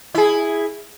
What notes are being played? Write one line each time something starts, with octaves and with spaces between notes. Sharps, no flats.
E4 G#4